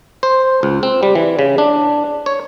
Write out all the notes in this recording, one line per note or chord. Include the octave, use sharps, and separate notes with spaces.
C5
C#2
C4
G3
E3
C#3
D4
C#5